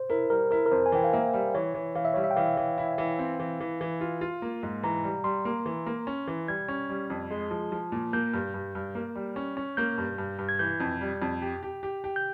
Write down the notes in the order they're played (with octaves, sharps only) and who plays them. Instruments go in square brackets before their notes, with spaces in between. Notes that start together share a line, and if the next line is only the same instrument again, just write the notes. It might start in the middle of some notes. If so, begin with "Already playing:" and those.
Already playing: [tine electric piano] C5
[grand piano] E4 [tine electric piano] A#4
[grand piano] G3 [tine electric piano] A#4
[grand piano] E4 [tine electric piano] A#4
[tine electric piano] A#4
[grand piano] F2 [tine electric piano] C5
[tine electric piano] G#5
[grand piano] E3 [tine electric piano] G5
[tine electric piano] F5
[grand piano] A#3 [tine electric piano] E5
[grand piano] G3
[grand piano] E3 [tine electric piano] C#5
[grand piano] E3
[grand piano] E3 [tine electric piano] F5
[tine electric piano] E5
[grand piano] G3 [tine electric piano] C#5
[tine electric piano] E5
G5
[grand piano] E3 [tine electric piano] F5
[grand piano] E3
E4
E3
C4
E3
E3
E3
F4
F4
A#3
G#2
[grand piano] E3 [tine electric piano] A#5
[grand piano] G3
[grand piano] G3 [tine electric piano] C6
[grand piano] A#3
E3
A#3
C#4
E3
[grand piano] G3 [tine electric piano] G#6
[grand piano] C#4
G3
F2
G#3
F3
F3
A#2
[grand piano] A#3 [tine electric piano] G6
[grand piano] G2
G2
G2
A#3
G3
C#4
C#4
[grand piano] A#3 [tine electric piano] G6
[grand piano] G2
G2
G2
[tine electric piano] G#6
[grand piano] E3 [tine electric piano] G6
[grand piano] F2
G3
F2
G4
G4
G4
G4
[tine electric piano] G6